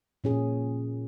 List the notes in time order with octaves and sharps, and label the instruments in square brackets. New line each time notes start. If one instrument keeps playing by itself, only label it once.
[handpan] A#2 C#4 G#4